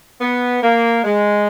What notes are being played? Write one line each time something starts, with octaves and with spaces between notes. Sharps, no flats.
B3
A#3
G#3